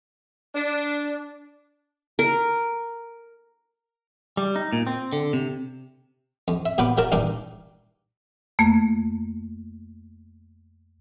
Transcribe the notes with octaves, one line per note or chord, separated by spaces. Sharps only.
D4
A#4
G3
D#4
A#2
C4
D3
C3
F2
E5
A#2 F#3 B3 F4 B4 D6
F#3 F4 F#4 A#4 A5
G2 A#2 D#3 G3 D4 D#4
F2 A3 A#3